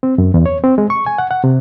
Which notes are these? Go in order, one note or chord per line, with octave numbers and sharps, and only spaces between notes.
C4
F#2
E2
C#5
C4
G#3
C#6
G#5
F#5
F#5
C3